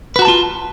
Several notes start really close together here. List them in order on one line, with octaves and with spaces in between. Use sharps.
B4 F#4 A#5 A5 F4